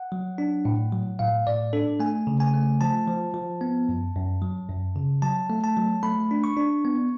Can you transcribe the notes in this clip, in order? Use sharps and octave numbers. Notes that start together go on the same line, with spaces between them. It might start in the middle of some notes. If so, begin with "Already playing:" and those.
Already playing: F#5
F#3
D4
A2
F#3
A2 F5
A2 D5
D4 A4
A3 G#5
C#3
G#5
A3
F3 A5
F3
F3
B3
F#2
F#2
F#3
F#2
C#3
F#3 A5
A3
A5
F#3
A3 B5
D4
C#6
D4
B3